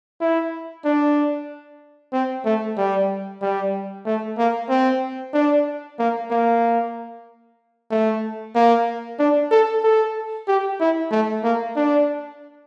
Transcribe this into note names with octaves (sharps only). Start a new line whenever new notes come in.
E4
D4
C4
A3
G3
G3
A3
A#3
C4
D4
A#3
A#3
A3
A#3
D4
A4
A4
G4
E4
A3
A#3
D4